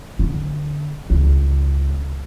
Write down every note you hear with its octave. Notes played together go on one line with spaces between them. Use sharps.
D3
C#2